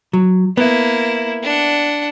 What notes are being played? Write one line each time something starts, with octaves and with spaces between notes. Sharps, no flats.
F#3
A#3 B3 E4
D4 F#5